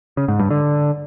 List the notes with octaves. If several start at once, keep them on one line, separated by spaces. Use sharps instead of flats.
C#3
G#2
G2
D3